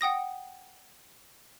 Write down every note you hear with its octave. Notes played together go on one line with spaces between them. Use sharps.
F#5 G5 D#6 A#6